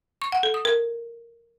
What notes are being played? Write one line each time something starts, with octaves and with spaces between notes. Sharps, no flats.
C#6
F#5
A4
D#6
A#4